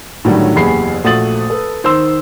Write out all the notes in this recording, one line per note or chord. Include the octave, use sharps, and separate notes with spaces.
A2 D3 D#3 F#3 G3
F#1 E2 G4 G#4 B5 C7
A#1 A3 F#4 D#6 A6 F#7
A4 B4
D#3 C5 C6 E6